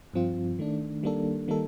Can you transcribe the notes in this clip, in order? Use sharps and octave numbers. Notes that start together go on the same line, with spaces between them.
G2 F3 C4 F4
D#3 A3 D4
D#3 G3 A#3 D4 A4
D#3 G3 A#3 D#4 A4